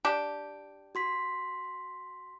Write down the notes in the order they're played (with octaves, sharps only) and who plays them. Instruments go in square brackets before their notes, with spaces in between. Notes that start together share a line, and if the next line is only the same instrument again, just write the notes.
[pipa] D4 G4
[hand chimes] F#4 C6 B6